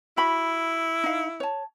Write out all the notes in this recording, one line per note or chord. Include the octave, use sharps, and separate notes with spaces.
E4 F#4 B5
D#4 F5
C#5 A5